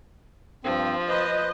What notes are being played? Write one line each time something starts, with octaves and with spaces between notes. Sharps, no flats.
G2 F3 C4
B4 C5 D#5